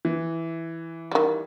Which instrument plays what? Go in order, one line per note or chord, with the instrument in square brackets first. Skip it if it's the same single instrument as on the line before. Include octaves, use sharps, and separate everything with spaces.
[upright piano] E3
[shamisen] D#3 G3